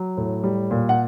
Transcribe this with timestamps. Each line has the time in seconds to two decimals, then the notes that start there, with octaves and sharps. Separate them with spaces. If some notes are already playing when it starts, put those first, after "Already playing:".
Already playing: F#3
0.17 A2
0.44 G3
0.71 A#2
0.89 F#5